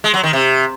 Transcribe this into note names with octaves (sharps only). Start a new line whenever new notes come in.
G#3
F#3
D#3
C3